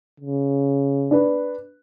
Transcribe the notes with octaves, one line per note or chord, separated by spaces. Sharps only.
C#3
D4 B4